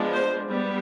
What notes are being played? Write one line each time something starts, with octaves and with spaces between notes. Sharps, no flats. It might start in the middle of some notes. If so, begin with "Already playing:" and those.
Already playing: F3 G#3 B3 D4
C5
G3 B3